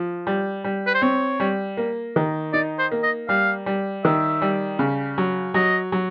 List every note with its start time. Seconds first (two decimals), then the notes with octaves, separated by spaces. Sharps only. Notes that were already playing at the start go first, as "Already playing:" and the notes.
Already playing: F3
0.27 G3
0.64 G3
0.87 B4
0.94 C5
1.02 C4 C#5
1.40 G3
1.77 A#3
2.16 D#3
2.53 D#4 D5
2.79 C5
2.92 A#3
3.03 D#5
3.29 G3 F5
3.66 G3
4.04 D#3 E5
4.42 G3
4.79 C#3
5.18 F#3
5.54 F#3 D#5
5.92 F#3